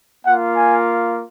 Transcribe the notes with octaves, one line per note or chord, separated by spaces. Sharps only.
A#3 F4 F#5
G#5